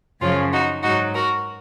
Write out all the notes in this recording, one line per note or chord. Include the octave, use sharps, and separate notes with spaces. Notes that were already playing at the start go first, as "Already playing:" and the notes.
F#2 C#3 F3 C#4 F4
D#4 F#4
G#2 F#3 D#4 F#4
F#4 A#4